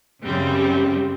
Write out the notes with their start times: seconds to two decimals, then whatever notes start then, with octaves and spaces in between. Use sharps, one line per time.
0.24 F#2 C#3 G3 C4